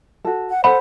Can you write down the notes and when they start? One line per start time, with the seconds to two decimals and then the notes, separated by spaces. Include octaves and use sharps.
0.25 F#4 A4
0.50 F#5
0.64 A4 C5 F#5 B5